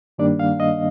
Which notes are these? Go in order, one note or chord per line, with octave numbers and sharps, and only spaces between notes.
G2 D#3 G3 A#3 D4 D5
F5
D#5